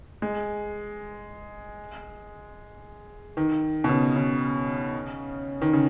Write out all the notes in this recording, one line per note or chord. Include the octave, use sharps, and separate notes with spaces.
G#3
D#3
B2
C#3
C#3
D#3
C#3